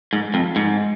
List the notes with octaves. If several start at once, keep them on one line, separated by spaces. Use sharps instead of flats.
G#2
F2
G#2